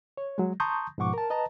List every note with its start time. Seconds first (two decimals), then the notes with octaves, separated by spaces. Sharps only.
0.17 C#5
0.38 F#3 G#3
0.60 A5 A#5 C6 C#6 D#6 G6
0.98 G#2 B2 F3 F#5 C#6 D6
1.14 A#4 A5
1.30 B4 D#5 A5 A#5